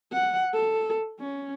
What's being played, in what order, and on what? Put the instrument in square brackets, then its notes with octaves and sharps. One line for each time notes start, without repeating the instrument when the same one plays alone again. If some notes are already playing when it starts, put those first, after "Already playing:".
[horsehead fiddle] F#5
A4
C#4